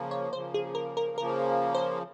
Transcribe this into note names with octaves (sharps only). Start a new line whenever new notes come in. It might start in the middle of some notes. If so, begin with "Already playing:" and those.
Already playing: C#3 F3 A#3
C#5
C#3 F3 A#3 C5
G#4
A#4
A#4
C#3 F3 A#3 A#4
C5